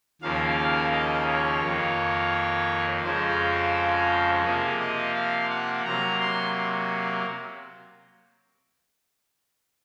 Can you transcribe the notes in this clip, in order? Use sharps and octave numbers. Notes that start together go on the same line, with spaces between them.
D#2 C#3 F3 A#3 F5
F5
D#5
C#5
F2 D#3 A#3
F2 C#3 F3 G#3 C5
C3 F3 A#3 G#4
D#5
F5
F#5
C3 F#3 A#3 A#5
C6